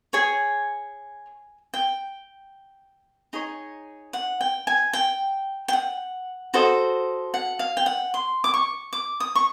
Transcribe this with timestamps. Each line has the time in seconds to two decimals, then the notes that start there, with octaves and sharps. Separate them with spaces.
0.13 G#4 C#5 G#5
1.74 G5
3.33 D#4 G#4 C#5
4.13 F#5
4.41 G5
4.67 G#5
4.93 G5
5.68 G5
5.73 F#5
6.54 F#4 A4 C5 D#5
7.34 F#5
7.59 F5
7.77 G5
7.86 F#5
8.14 C6
8.44 D6
8.54 C#6
8.93 D6
9.20 D#6
9.35 C#6